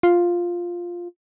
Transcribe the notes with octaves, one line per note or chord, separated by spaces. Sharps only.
F4